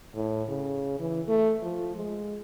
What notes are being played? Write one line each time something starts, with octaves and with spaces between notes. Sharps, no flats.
A2
C#3
E3
A3
F3
G#3